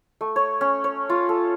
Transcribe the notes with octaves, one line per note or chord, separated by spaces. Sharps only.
A3
C#5
C#4
C#5
F4
A4